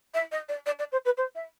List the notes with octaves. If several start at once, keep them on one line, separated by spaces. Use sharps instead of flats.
E5
D#5
D5
D5
D5
C5
B4
C5
E5